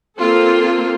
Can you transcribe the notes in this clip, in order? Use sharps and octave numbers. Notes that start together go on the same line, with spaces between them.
A#3 C4 F4 A4